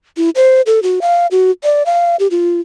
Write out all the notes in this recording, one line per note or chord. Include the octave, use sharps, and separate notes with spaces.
E4
C5
A4
F#4
F5
F#4
D5
F5
G4
F4